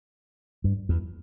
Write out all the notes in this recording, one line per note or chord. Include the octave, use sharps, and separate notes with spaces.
G2
E2